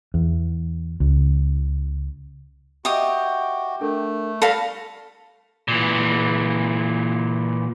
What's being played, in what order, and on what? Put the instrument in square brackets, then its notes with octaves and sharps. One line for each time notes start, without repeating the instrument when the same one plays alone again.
[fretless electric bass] E2
C#2
[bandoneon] F#4 [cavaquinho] G4 D#6 [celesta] D#5 E5
[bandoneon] A3 [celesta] D4 A4 A#4
[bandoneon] G3 B5 [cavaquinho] A4 F5 [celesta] A5 A#6
[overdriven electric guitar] A#2 E3